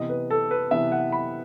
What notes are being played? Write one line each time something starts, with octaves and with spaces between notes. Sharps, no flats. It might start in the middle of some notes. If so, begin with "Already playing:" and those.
Already playing: C3 E3 B3 D#5
B4
A4
B4
C3 E3 B3 E5
F#5
B5